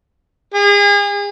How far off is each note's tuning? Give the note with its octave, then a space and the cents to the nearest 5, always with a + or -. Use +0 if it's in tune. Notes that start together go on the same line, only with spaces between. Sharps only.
G#4 -35